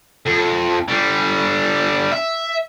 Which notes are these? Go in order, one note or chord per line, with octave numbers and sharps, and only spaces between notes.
F2
D3 G3
E5